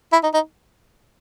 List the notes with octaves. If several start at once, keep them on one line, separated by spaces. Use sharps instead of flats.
E4
D#4
D#4